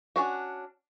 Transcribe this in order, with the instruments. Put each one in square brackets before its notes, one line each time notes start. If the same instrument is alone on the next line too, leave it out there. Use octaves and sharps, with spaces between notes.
[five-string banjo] C#4 D4 F#4